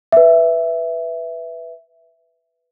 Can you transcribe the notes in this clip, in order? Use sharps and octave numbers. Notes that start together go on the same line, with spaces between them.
B4 E5